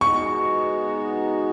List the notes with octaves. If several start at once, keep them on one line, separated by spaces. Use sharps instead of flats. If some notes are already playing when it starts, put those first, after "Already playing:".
G#3 B3 D#4 F#4 C#6